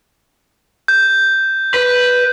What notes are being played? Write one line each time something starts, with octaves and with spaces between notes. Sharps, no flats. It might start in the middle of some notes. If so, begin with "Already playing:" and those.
G6
B4